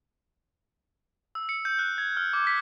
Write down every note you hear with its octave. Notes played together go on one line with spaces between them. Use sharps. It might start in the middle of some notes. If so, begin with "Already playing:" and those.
E6
C#7
G6
F#6
G#6
F6
D6
B6